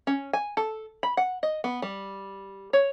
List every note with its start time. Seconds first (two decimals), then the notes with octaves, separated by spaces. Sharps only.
0.07 C#4
0.33 G#5
0.57 A4
1.03 B5
1.17 F#5
1.43 D#5
1.64 B3
1.82 G3
2.73 C#5